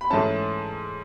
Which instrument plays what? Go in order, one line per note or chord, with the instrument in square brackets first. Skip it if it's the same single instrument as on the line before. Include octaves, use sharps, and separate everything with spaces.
[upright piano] B5
G#2 E3 A3 C#4 A5